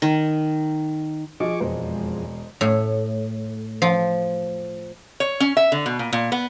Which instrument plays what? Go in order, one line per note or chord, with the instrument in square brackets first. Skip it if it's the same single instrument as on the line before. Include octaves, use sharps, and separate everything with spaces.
[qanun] D#3
[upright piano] F3 [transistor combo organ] G#4 C#6 D6 [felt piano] D#5
[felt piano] E1 [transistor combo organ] F2 G#3 [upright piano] C5 D#5
[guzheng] A2
F3
[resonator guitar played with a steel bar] C#5
C#4
E5
D3
B2
A#2
A#2
B3